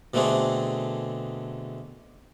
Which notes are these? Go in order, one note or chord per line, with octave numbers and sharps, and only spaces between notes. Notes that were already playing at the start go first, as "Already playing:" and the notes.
B2 D3 A3 C4 D4 G#4